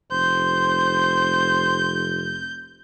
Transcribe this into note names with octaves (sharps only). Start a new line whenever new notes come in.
F1 C5 G6